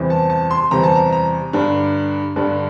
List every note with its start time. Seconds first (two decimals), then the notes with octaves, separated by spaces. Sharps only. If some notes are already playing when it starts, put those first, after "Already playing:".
Already playing: E2 C3 E3 G3 C4
0.10 A5
0.30 A5
0.51 C6
0.71 E2 C3 E3 G3 C4 A#5
0.84 A5
0.95 A#5
1.12 A#5
1.53 G2 D3 G3 D4
2.36 G2 D3 G3 D4